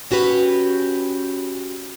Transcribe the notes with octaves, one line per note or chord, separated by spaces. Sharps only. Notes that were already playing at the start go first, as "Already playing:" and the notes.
C#4 F#4 G4 B4